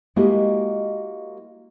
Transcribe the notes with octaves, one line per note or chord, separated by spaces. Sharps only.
G#3 A#3 E4 F#4 G4 D#5